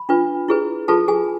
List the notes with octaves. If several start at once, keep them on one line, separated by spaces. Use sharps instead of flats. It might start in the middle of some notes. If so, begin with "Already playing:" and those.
Already playing: B5
D4 F4 B4
E4 G#4 B4
F4 G#4 A4 B4 A5
G#4 G#5